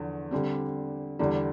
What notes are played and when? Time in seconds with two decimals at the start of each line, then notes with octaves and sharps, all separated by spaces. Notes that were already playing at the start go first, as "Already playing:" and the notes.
Already playing: E2 D3 F3
0.31 D3 G3 C4
1.19 E2 D3 G3